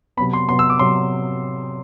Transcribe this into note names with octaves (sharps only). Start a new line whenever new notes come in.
C3 F#3 B3 B5
C6
C3 F#3 B3 C6
E6
D6
C3 F#3 B3 C6